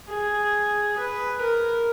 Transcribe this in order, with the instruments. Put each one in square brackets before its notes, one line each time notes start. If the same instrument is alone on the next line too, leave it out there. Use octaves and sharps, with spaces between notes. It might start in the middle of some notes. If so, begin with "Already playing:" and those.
[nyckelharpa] G#4
B4
A#4